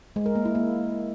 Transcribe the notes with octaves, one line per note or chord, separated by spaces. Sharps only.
G#3
A#4
A#3
E4
A#3